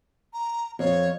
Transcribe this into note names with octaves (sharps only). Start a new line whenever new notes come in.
A#5
F2 C#5